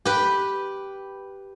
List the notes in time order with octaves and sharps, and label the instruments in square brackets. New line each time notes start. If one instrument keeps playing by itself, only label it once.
[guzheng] G4 B4